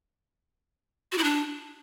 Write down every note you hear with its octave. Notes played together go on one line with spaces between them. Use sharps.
F#4
E4
D4